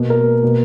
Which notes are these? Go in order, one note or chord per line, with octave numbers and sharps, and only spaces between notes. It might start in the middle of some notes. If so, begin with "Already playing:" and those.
Already playing: B2 A#3
A#4
B2 A#3